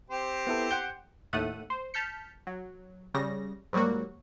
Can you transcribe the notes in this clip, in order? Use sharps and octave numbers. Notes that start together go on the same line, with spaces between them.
C4 G4 C5
B3 E4 A4
F#5 G5 G6
D#2 A2 A3 F#5 D#7
C5
A5 F6 G6 B6 C#7
F#3
C#3 G3 A#6
G#2 F#3 G3 A#3 F#4